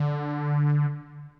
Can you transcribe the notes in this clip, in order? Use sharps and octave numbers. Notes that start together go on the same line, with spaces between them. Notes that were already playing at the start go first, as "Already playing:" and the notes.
Already playing: D3